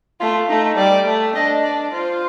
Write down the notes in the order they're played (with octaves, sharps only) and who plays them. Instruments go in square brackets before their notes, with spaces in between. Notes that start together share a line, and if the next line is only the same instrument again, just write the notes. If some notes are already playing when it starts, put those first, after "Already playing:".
[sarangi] A3 [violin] F4
[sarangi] A3 [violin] D#4
[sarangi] G3 [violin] D5
[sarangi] A3
[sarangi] D4 [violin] D#5
[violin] D5
[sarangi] F4 [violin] C5